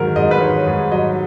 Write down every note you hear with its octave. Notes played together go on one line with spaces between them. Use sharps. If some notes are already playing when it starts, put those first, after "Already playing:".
Already playing: G#2 D#3 F#3 A#4
G#2 D#5
B4
D#3 C#5
G#2
F#3 D#5